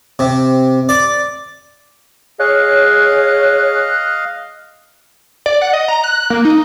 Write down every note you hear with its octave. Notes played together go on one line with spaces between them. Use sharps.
C3
D5
G#4 C#5 D#5 F5 F#6
D5
F#5
D#5
A#5
F#6
A#3
D#4